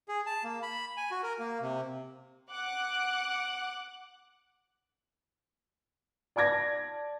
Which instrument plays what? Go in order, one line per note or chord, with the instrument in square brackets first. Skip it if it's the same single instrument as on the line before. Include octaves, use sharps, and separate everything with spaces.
[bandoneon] G#4
A5
A#3
B5
G#5
F#4
A#4
A#3
C3
[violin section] F#5 D6 F#6
[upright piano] D5 A5 D6 G#6 A#6